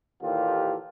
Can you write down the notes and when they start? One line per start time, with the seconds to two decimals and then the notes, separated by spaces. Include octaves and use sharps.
0.22 D#2 A#2 E3 F4 G4 A4